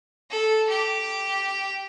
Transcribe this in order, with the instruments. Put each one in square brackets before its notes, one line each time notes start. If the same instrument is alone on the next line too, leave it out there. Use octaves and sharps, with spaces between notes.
[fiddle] A4
G4